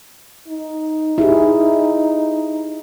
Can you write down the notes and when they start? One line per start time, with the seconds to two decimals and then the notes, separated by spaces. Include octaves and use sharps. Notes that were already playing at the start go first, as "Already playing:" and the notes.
0.48 D#4
1.18 E4 G4 G#4